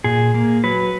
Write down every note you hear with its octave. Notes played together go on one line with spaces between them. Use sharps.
A#2 G#4
A#3
F#3 B4